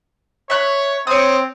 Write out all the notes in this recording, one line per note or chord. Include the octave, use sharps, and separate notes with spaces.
C#5 E5 F#6
C4 C#5 D#6